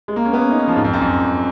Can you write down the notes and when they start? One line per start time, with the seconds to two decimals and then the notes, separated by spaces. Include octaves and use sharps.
0.08 G#3
0.16 A#3
0.25 C#4
0.33 B3
0.41 C#4
0.51 D#4
0.59 C#4
0.67 F3
0.76 G#2
0.84 F2
0.93 F#2
1.01 F2